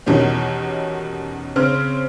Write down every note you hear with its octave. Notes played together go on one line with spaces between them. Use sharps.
E2 B2 D#3 G3 C#4
C#3 C4 C#4 F6